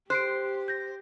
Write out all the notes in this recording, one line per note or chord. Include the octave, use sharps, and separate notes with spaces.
G4 C5 F#6 C7 D7
G6 A#6